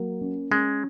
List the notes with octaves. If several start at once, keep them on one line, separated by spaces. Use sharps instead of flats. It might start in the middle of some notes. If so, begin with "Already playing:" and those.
Already playing: F#3 A#3
C#4
G#3 C#4